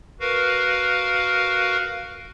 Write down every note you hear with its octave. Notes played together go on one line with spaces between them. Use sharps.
F#4 A#4 B4 F5